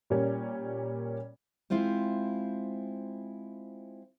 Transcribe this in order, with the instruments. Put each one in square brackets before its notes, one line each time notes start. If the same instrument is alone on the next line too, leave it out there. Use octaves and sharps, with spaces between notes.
[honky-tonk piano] A#2 G3 A#3 C#4
[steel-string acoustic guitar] G#3 C4 E4 F4 C5